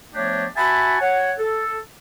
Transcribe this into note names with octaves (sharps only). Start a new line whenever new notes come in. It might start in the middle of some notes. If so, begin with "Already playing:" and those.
F3 A3 B3 D4 G4 C#5
F#4 E5 F#5 G#5 A5 B5
C#5 F#5
A4